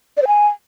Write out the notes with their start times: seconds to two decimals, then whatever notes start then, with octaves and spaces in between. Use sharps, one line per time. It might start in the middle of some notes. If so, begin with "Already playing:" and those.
0.17 D5
0.22 C5
0.27 G#5